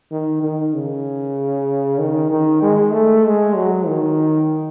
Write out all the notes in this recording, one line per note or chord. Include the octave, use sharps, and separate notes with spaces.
D#3
D#3
C#3
D#3
D#3
G#3
A3
G#3
F#3
D#3